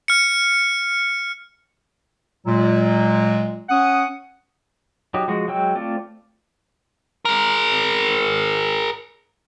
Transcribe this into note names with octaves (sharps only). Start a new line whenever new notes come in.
F6 C#7
A#2 F#3 G#3
C#4 F#5 D#6
F#3 D#4 G4
F3 G#3 F#4
F#3 G#3 G5 E6
A3 C4 F4 D5
G#4 A#4